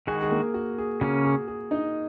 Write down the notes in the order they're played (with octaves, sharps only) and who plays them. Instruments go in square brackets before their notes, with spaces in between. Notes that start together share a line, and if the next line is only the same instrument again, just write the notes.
[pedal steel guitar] D#3 G#3 F#4 [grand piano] G#4 G#5
[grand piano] G#4
A#3 A#4
F#4
G#4
[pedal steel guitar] C#3 A#3 C#4 [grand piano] F#4
[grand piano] G#4
G#4
D#4 D#5